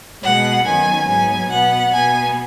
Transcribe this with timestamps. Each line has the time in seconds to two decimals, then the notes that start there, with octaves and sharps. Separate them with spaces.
0.23 B2 G#3 B3 F#5
0.65 F#2 D#3 B3 G#5
1.07 G#2 F#3 B3 G#5
1.50 B2 B3 F#5
1.93 B2 B3 G#5